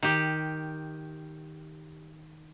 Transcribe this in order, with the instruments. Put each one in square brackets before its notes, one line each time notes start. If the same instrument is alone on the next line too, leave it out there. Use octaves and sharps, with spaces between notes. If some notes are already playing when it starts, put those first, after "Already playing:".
[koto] D#3 G4